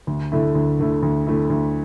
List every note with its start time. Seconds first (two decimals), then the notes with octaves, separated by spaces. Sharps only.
0.07 D2
0.32 D3 A3 E4
0.55 D2
0.79 D3 A3 E4
1.03 D2
1.27 D3 A3 E4
1.50 D2